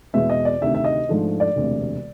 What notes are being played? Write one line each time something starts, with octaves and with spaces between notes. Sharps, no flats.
E2 B2 G#3 E5
D#5
D5
D2 C3 D#3 E5
E5
D#5
G#2 F3 A3 D4
D5
E1 D2 C3